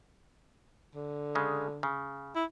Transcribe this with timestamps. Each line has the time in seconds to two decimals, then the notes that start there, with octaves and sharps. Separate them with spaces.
0.95 D3
1.35 C#3 G#3
1.83 C#3
2.36 E4